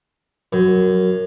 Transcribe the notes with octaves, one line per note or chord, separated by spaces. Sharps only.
F#2